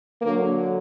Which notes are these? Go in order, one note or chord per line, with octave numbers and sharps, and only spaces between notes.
D3 F#3 A#3